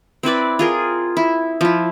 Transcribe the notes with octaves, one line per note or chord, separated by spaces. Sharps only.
C4 E4 B4 D5
F4 G#4 A#4
E4
F3 E4